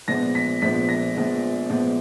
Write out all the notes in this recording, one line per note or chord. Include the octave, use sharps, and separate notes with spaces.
A#1 A#2 F3 G#3 B3 A#6
B6
A#1 A#2 F3 G#3 B3 B6
A#6
A#1 A#2 F3 G#3 B3
A#1 A#2 F3 G#3 B3